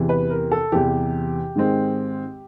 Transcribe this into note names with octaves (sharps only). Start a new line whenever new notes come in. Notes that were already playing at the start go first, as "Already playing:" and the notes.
Already playing: E2 C3 E3
B4
A#4
A4
E2 C3 E3 G4
G#2 D#3 G#3 C4